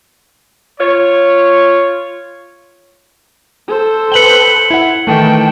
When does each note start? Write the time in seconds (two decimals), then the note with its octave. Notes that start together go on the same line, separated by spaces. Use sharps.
0.80 F4 C#5
3.68 A4 C5
4.12 B4 G5 C#7 F#7 G7
4.70 E4 F#5
5.07 D#3 E3 A3 G5 A5